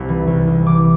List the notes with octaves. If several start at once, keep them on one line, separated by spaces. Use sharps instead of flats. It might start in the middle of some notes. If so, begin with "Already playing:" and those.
Already playing: C2 C3 C6
E3
C2
C2
E3 D6